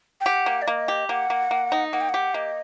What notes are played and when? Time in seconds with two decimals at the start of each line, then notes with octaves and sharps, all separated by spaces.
0.21 G5
0.26 G4 F#5
0.46 A#3
0.62 D5
0.67 A#3 D#5
0.88 G4
1.09 A#3 F#5
1.30 A#3
1.51 A#3
1.72 D#4
1.93 A#3 F#5
2.01 G5
2.09 G4 F#5
2.34 A#3 D#5